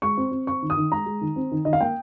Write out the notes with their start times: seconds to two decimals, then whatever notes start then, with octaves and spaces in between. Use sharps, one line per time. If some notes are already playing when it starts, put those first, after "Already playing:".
0.02 G#3 C#6
0.17 C4
0.31 C4
0.47 C4 C#6
0.62 D#3
0.70 D#6
0.77 D#3
0.92 G#3 A#5
1.06 G#3
1.21 D#3
1.36 C4
1.52 D#3
1.65 D#3 D#5
1.73 F5
1.81 A#3 G5